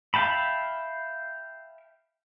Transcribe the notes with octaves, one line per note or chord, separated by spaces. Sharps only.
E5 F5 G5 A5 B5